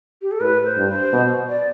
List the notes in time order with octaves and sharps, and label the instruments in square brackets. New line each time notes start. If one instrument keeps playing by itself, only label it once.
[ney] G4
A4
[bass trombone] A2 [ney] B4
[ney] C5
[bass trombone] G2
[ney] C5
[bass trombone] B2
[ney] D5